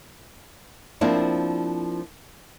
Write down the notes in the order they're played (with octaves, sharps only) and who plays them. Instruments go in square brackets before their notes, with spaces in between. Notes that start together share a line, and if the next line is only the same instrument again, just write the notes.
[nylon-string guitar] F3 A#3 C4 D4 E4